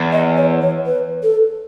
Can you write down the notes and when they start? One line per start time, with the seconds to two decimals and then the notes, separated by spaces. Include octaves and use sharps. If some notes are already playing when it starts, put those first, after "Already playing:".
Already playing: E2
0.12 D#5
0.37 C#5
0.62 C#5
0.86 B4
1.23 A4